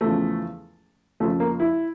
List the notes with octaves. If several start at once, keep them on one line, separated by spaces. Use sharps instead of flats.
E2 C#3 F3 A3
F2 C#3 F3 A3
A#3
E4